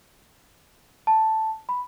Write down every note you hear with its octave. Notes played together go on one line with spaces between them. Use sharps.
A5
B5